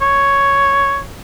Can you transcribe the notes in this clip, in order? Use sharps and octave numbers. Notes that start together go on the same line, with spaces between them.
C#5